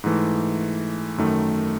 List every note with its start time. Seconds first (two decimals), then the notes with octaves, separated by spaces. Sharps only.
0.04 G#2 E3 A3
1.18 F#2 D#3 A3